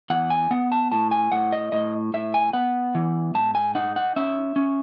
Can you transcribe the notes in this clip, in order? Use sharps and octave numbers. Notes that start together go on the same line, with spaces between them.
E2 F#5
G#5
B3 F#5
A5
A2 A5
G#5
A2 F#5
D#5
A2 D#5
A2 E5
G#5
B3 F#5
E3
G#2 A5
G#5
D#4 F#5
F#5
C#4 E5
C#4